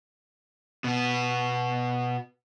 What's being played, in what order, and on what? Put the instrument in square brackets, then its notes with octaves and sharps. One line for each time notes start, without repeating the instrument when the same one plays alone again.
[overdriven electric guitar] B2 B3